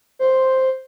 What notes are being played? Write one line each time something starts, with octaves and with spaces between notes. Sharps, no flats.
C5